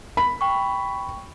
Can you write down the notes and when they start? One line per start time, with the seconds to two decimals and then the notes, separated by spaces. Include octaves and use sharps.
0.17 B5
0.41 G5 C#6